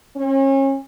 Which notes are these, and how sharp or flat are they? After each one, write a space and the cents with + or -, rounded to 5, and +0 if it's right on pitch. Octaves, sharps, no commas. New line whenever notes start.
C#4 -35